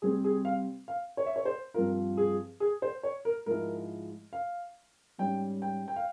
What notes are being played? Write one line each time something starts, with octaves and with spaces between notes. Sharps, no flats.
C3 G3 C4 G#4
G#4
F5
F5
C#5
E5
C#5
C5
G2 F3 C4 F4 A#4
G#4
G#4
C5
C#5
A#4
G#2 F3 G#3 E4 A#4
F5
G#2 G3 C#4 G5
G5
G5
F5